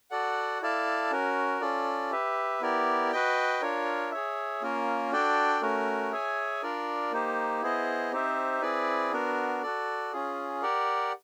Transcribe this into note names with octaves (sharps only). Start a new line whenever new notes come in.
F#4 A4 D5 F#5
E4 A4 D5 F5 A5
C#4 F#4 A#4
C#4 F4 A4 D5
G4 B4 E5
B3 E4 G4 A#4 D5
F#4 B4 D#5 G5
D4 F4 A#4 C#5
G#4 C#5 E5
A#3 C#4 F4 A#4
D4 F#4 A4 D5 G5
A3 C#4 F#4 A#4
G#4 C#5 E5 G#5
D4 F4 A#4 D5
A#3 D#4 G4 C5
B3 E4 G#4 C5 D#5
C4 D#4 G4 C5 E5
C4 E4 G#4 B4 D5
B3 D4 F#4 A#4
F#4 A4 D5
C#4 F4 G#4
G4 A#4 D5 F#5